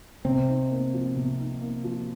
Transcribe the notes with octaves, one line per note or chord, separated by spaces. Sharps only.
C3 C4
D#4
A#3
F3
C3
D#4
A#3
F3